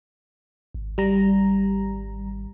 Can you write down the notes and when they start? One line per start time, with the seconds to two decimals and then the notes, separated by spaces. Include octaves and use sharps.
0.74 G#1
0.98 G3 A#5